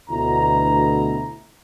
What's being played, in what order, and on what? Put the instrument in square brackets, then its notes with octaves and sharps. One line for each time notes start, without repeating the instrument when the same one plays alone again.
[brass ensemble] D2 B2 E4 A#5